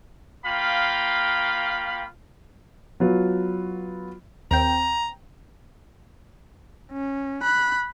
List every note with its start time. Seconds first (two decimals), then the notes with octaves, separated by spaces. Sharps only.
0.45 A#3 F4 F5 G5 B5
3.00 F#3 B3 F4 F#4
4.51 D#2 C4 G5 A#5
6.92 C#4
7.43 B5 F#6